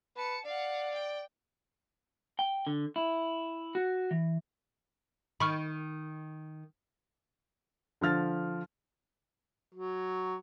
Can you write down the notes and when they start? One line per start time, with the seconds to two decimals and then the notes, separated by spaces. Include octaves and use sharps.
0.17 B4 A5 C#7
0.45 D5 F5 F#5
0.94 G5
2.39 G5
2.67 D3
2.96 E4
3.75 F#4
4.11 E3
5.40 D#3 B5 C#6 F6
8.01 D3 F3 F6 A6
9.74 F#3